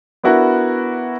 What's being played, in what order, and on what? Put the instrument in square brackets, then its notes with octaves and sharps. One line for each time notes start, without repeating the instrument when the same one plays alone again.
[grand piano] B3 D4 E4 F#4 A#4